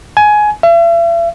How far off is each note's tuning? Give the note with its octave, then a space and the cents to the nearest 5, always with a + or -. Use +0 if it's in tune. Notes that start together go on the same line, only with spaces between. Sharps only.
G#5 +15
E5 +45